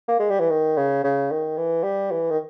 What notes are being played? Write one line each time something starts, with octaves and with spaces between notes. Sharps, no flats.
A#3
G#3
G3
E3
D#3
C#3
C#3
D#3
E3
G3
E3
D#3